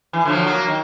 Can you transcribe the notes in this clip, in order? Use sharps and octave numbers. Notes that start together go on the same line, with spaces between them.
E3
D3 F3 F#3
F#3 A#3
D#3